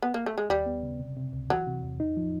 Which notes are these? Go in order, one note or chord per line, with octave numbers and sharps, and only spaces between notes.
B3
A#3
A3
G#3
D#2 G3
B3
C#3
C3
C3
C#2
E3 F#3
C3
E2
D#4
F3